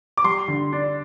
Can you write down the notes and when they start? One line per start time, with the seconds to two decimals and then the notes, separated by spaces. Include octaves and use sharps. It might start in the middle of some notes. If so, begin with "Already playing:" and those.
0.17 D6
0.24 G3 C6
0.48 D3
0.73 D4